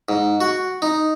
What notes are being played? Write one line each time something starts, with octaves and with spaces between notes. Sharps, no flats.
G#2
F#4
D#4